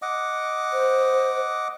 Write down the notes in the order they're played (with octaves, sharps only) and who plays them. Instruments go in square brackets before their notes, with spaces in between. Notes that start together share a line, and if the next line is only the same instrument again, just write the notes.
[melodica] D#5 F#5 D6
[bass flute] C5